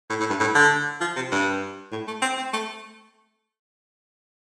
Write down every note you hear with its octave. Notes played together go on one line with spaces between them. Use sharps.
A2
A2
G2
A2
D3
F3
C3
G2
A2
A3
C4
C4
A3